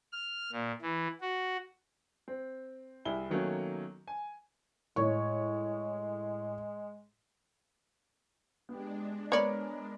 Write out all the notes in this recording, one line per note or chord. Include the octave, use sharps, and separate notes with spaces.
F6
A#2
E3
F#4
C4
C2 E4 G#4 G7
B2 D#3 F#3 A3 A#3 C#4
G#5
A2 G#3 C#5 C#6
G#3 B3 D4 G4
B3 A#4 C#5 D5 B5